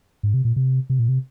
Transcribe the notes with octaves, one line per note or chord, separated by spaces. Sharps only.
G#2
C3
A#2
C3
C3
A#2
C3